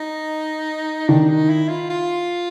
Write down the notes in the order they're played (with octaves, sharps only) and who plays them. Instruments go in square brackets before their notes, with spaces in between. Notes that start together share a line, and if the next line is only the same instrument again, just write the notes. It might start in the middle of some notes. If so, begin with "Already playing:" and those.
Already playing: [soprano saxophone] D#4
[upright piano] D#3 [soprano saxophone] D4
[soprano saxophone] D#4
E4
F4
F4